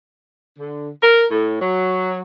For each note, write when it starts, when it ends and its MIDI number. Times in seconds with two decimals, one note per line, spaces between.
0.57 0.89 50
1.01 1.23 70
1.30 1.58 45
1.59 2.21 54